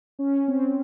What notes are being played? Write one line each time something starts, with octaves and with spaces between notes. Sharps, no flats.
C#4
C4